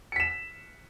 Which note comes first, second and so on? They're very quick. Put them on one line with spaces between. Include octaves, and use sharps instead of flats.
C#7 B6 E7